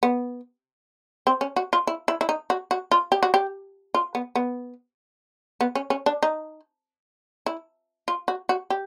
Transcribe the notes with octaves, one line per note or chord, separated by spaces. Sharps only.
B3
C4
C#4
F#4
F4
E4
E4
E4
D#4
F#4
F#4
F4
G4
F#4
G4
F4
B3
B3
B3
C#4
C#4
D4
D#4
E4
F4
F#4
F#4
G4